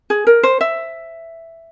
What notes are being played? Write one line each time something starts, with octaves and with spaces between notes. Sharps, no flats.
G#4
A#4
C5
E5